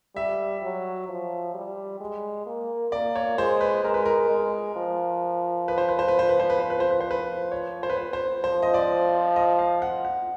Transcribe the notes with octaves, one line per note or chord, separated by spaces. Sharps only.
G3 E5
F#3
F3
G3
G#3
A#3
A#3 D5
C#5
G#3 C5
B4
G#3 A#4
B4
A#4
G#3
F3
B4
C5
B4
C5
B4
C5
B4
C5
B4
C5
B4
C5
B4
C5
B4
C#5
C5
B4
C5
C5
F3 C5
D#5
D5
D#5
F5
F#5
F#5